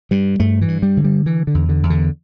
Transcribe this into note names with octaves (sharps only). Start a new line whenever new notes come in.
G2 G3
G2 A3
E3
G2
G3
D3
G3
D3 E3
D3
E2
D3
E2
D3